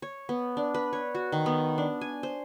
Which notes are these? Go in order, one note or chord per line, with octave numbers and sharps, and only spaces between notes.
C#5
B3
D4
B4
C#5
F#4
D#3
B3
D4
G#5
C5